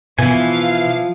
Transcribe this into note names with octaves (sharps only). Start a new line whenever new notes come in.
B2 E3 F3 F5 G#5